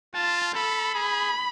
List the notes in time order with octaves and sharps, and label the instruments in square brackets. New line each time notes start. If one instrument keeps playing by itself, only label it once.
[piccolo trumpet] F4 [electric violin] A5
[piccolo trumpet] A4 [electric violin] B5
[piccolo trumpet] G#4